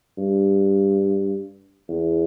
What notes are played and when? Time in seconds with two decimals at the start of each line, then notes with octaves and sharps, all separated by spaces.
0.18 G2
1.89 E2